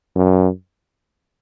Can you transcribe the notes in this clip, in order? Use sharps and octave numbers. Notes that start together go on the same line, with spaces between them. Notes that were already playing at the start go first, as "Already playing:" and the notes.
F#2